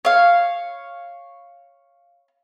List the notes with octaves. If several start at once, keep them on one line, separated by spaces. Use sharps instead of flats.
C#5 F5